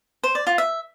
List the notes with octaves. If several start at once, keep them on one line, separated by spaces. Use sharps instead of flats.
C5
D5
F4
E5